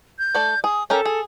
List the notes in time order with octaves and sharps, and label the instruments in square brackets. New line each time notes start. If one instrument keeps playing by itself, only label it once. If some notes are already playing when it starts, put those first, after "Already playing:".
[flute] G6
[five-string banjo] A3 A4 D5
[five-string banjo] G#4 [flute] D#6
[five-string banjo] C#4 G4 A#4 [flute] A4
[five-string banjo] G#4